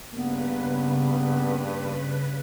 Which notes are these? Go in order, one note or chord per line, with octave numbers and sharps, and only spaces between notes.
G2 C#3 A#3 B3 B4